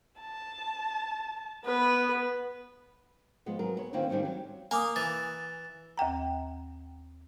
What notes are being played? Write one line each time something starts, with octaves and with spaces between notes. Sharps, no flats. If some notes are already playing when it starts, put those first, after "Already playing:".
A5
B3 B4
F3 G#3 B3
F#3 G#4 A#4
B3 C#5
D3 D#3 A#3 C4 C#4 F4
D#3 G3 C4 C#4 D#4
F#3
A#3 G#5 D6 D#6
E3 A6
D#2 F#5 G5 A#5